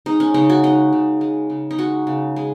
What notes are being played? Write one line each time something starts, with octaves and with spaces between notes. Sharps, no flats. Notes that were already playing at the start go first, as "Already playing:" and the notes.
G#3 D#4
C#4
C#3 D#4
F#4
G#3 D#4
C#3
G#3
C#3
D#4
G#3 F#4
C#3
G#3